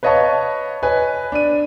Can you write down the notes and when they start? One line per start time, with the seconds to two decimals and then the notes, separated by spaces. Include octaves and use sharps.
0.03 B4 C#5 D#5 F5 A5 C#6
0.83 B4 C#5 D#5 G#5
1.32 D4 D#7